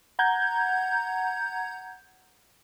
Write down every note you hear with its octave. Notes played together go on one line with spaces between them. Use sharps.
F#5 A#5 G6 G#6